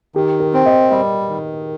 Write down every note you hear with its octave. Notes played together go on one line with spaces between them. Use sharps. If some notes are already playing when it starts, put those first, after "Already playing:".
D#3 G4
A#4
C4
D#5
G3 D#5
D#3